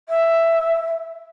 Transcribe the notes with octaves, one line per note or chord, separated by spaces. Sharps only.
E5